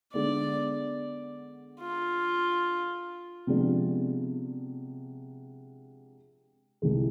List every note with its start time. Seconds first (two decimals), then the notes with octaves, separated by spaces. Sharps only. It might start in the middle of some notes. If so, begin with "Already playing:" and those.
0.13 D3 G#3 B3 D5
1.80 F4
3.47 C3 F3 G#3 B3 D4
6.82 C2 C3 E3 G#3